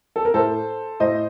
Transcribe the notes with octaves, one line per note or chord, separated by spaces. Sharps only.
A4
A#4
A2 A4 C5
A2 C5 D#5